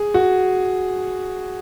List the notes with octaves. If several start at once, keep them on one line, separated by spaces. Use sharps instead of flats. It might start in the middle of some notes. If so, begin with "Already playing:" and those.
Already playing: G#4
F#4